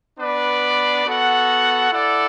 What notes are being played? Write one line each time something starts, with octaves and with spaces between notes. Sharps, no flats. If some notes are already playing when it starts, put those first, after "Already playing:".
B3 D4 B4 D5
B3 F#4 A4 F#5
E4 A4 D5 F#5